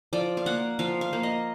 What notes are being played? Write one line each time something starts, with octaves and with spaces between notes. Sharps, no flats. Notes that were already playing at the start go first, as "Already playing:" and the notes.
F3 D5
F5
A#3 F#5
F3 F5
F5
A#3
D#5